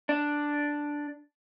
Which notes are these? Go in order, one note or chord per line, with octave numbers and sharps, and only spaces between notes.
D4